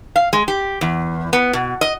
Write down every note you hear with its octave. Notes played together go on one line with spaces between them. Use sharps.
F5
G#3
G4
E2
B3
B2
D#5